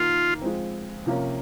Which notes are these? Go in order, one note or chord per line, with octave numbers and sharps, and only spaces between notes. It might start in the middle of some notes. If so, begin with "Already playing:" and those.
Already playing: D#3 A#3 D#4 F4
F3 G#3 C4
C3 F3 A#3 C#4